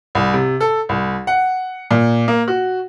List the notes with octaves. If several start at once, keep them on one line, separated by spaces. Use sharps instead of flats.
C2
C3
A4
C2
F#5
A#2
A#3
F#4